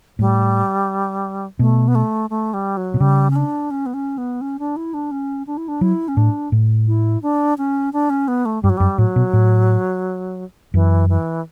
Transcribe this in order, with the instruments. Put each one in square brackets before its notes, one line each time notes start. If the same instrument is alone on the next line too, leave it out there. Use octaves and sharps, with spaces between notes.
[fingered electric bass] A2 [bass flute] G3
[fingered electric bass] B2 [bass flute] A3
[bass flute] B3
A3
A3
G3
F#3
[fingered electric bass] B2
[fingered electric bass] C#3 [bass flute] G3
[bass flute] C#4
D4
C#4
B3
C#4
B3
C#4
D4
E4
D4
C#4
D4
E4
D4
[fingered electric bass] F#3 [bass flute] E4
[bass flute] C#4
[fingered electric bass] A2 [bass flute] D4
[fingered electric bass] A2
[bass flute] E4
D4
C#4
D4
C#4
B3
A3
[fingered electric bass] G2 [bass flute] G3
[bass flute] F#3
[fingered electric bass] F#2 [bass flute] G3
[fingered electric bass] A2 [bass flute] F#3
[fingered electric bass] B2
A2
[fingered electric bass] F#2 [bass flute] E3
[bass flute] E3